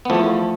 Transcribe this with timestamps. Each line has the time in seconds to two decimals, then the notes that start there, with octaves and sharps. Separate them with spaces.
0.05 B3
0.10 E2 F3 A3